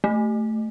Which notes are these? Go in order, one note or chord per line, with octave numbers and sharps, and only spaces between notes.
A3